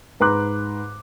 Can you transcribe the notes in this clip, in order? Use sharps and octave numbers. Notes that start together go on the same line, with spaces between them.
G#2 B4 A#5 C6 D6 F#6